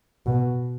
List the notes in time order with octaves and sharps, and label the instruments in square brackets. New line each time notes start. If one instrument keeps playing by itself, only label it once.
[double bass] B2